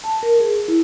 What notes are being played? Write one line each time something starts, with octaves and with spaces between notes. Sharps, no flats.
A5
A#4
G#4
E4